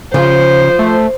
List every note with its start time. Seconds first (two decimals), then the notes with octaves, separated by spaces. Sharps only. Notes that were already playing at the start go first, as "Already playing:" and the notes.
0.14 C#3 F3 C5
0.79 A3